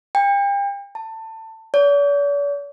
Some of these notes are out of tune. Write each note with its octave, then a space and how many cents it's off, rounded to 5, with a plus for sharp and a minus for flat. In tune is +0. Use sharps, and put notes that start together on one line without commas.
G5 +35
A5 +25
D5 -45